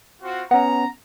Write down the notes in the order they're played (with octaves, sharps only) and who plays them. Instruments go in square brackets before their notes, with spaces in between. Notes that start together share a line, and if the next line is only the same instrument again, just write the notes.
[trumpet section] C4 F4 F#4
[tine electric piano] B3 C#4 [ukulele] F#5 [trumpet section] A#5